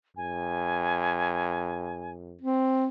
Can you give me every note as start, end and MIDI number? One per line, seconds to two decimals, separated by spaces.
0.17 2.37 41
0.17 2.12 80
2.42 2.88 60